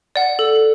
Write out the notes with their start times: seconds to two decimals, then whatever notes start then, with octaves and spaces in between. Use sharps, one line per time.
0.16 D5 F#5
0.39 A4